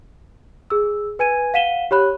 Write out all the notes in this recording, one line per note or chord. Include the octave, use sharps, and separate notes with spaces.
G#4 E6
B4 G#5 G#6 D#7
F5 F#5 B6 D#7 E7 G7
G4 C#5 B5 F#6